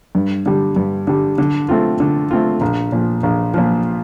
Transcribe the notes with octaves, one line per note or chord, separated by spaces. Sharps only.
G2
D3 G3
G2
D3 G3
D3
A3 C4 F4
D3
A3 C4 F4
A#1
A#2 F3
A#1
A#2 F3